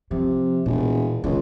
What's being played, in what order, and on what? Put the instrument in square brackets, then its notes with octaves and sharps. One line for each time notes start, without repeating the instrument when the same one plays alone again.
[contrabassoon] C3 [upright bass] F3
[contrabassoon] E1 [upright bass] A#2
[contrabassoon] C#2 [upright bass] D#3